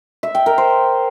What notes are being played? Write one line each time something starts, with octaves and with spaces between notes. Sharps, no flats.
E5
G5
A#4
C5